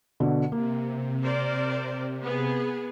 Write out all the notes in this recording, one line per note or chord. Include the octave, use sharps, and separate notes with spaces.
B2 D3
C3 A#3
A#4 C5 D5
B3 G#4